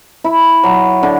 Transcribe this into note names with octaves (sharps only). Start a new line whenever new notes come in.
E4
F#3
D3